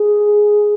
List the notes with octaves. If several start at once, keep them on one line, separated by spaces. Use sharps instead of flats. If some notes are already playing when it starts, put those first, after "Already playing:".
Already playing: G#4